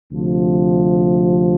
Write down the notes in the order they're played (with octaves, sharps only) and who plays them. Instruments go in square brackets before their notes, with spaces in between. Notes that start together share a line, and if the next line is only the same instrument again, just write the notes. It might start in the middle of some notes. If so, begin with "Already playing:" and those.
[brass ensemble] D2 C3 F3